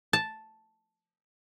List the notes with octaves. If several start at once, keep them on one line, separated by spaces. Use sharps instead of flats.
A5